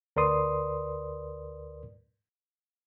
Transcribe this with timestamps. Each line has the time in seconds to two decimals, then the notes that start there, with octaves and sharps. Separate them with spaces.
0.16 D2 A#4 B4 D5 C6 D#6